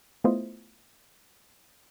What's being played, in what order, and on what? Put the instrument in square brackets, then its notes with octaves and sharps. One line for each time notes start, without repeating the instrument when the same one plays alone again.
[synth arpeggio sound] A3 B3 E4 F4 C5 D#5